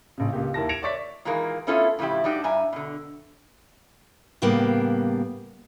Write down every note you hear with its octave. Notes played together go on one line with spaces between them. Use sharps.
A#1 C#3
C#2 A#2 A#3 G4
D#2 E4 A#4 A5 A#6
G#6 A#6 C#7 D7 E7 F7
C#5 D5 E5 C#6 A6 B6
A#2 D#3 E3 G#3 A#3
A3 B3 C#4 E4 F4 A4
A2 C#3 F3 E4 G4
G2 D4 D#4 F#4 G4
G2 E5 G#5 A#5
B2 D3
A2 C#3 G3 A#3 B3 D4